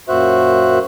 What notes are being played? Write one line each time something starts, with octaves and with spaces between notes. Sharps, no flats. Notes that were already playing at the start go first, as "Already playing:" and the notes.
F#2 A#2 F#4 C5 E5 F#6